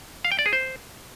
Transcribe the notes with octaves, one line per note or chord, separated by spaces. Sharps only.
F5
G5
D5
G#4
C5